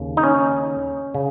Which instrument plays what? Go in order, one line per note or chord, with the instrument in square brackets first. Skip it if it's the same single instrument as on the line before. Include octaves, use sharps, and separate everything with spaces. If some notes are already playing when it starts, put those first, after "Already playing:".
Already playing: [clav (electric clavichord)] D#2 C#3
D#4
C#4
C#3